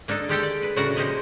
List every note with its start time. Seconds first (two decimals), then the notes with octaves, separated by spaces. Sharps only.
0.08 A#3 D4 D#4 A4
0.29 G#3 G4 A4 G5
0.43 D5
0.63 B4
0.76 A2 C#3 D4 F#4 A#4 F#5
0.96 F3 G#3 A#3 D#4 G4 C5